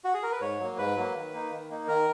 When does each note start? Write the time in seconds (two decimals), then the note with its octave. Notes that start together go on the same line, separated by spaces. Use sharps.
0.05 F#4
0.14 G#4
0.23 A#4
0.32 B4
0.41 G#2 C#5
0.60 F#3 A#3
0.78 G#2 B4
0.96 F#3 A#3
1.15 D#3
1.32 A#3 D#4
1.51 D#3
1.70 A#3 D#4
1.88 D#3 A#4